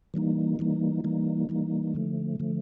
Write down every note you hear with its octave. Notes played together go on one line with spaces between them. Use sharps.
E3 G3 A#3 D#4
E3 G3 A#3 D#4
E3 G3 A#3 D#4
E3 G3 A#3 D#4
D3 F3 A3
D3 F3 A3